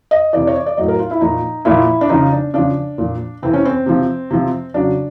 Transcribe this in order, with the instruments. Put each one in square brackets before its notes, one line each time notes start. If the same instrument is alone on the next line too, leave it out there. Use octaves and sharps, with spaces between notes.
[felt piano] D#5
C3 E3 D5
C#5
D5
D5
A2 F#3 D#5
A#4
F4
E4
A#2 F3 D#4
A#2 F3 E4
D4
C#3 F3 D#4
D4
C#3 F3 D4
A#2 F3
C3 E3 C4
C#4
C4
C3 F3
C3 F3
C#3 F#3 D4